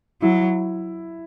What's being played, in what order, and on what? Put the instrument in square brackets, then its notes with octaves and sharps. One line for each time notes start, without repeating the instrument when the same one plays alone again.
[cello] F#3 [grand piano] E4